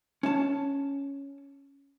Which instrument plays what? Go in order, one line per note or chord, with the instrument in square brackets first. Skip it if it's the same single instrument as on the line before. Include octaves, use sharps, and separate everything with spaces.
[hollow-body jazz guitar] C#4 A5